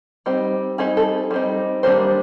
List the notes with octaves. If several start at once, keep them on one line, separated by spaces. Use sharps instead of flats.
G3 C4 D#4
G3 C4 D#4 G#4
A4
G3 C4 D#4
D#3 G3 A#3 D4 C5